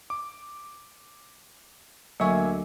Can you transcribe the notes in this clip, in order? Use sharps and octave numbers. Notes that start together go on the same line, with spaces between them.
D6
D2 F#3 A#3 E5 G#5 C#6